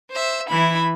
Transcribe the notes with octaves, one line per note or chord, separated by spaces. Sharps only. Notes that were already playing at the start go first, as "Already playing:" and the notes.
C5 E5
E3 E4 B5